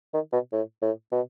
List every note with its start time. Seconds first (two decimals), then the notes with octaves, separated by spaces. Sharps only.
0.14 D#3
0.33 B2
0.52 A2
0.82 A2
1.12 B2